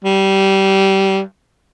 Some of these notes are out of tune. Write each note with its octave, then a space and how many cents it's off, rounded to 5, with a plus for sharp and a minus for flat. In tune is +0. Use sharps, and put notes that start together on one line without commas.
G3 -20